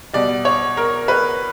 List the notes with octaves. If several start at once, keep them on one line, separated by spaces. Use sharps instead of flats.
B2 G3 D5
C#5
A#4
B4